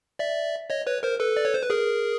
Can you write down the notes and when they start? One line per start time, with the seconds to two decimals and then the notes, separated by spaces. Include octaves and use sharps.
0.19 D5 E5
0.70 C#5 D#5
0.87 B4 C#5
1.03 A#4 C5
1.20 A4 B4
1.37 D5
1.45 C#5
1.54 C5
1.63 B4
1.70 G#4 A#4